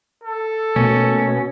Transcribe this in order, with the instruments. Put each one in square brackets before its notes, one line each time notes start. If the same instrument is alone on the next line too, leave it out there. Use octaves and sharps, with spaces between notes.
[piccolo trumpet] A4
[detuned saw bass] B2 [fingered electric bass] A3 A#3 [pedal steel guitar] C#4